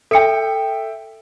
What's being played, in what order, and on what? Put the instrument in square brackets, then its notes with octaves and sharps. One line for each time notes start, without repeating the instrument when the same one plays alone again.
[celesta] A4 C#7 [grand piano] E5 G5